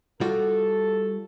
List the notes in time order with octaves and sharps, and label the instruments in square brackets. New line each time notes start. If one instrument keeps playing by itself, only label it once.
[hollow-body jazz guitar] G3 F4 F#4 [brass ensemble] A4